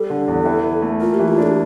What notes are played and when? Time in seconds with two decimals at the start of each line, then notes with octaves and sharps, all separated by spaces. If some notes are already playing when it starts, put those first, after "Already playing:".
Already playing: G3 A4
0.10 D3
0.28 E2
0.46 E3
0.64 E4
0.82 A3
1.00 A#3 F4
1.14 G4
1.19 E3
1.28 F4
1.38 D4 A4
1.47 G4